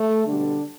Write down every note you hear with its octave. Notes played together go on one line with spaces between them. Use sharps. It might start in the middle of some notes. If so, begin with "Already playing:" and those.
Already playing: A3
B2 D3 G3 D4